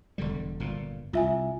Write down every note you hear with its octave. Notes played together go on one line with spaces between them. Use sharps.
E1 D3 G3
G1 A#2
C2 F4 E5 G#5